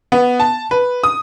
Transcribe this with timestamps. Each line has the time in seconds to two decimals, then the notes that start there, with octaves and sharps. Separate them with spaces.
0.12 B3
0.40 A5
0.71 B4
1.04 D#6